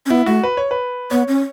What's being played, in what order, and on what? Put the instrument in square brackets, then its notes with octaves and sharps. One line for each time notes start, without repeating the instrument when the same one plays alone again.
[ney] C#4
[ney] B3 [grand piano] E4
[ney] A3 [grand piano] F#4
[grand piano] B4
C#5
B4
[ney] B3 [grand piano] C#5
[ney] C#4